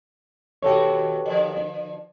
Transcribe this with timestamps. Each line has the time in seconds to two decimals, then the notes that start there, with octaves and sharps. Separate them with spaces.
0.62 D#2 B2 F#4 G4 A4 C#5
1.26 D3 F3